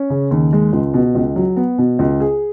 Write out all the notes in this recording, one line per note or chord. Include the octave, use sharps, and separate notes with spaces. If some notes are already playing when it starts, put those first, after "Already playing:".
Already playing: C#4
C#3
D#2
G#3
C#2
B2
C#2
F#3
B3
B2
C#2
G#4